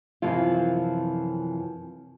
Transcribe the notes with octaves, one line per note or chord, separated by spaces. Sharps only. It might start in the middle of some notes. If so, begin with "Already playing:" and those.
F#2 C3 E3 F3 F4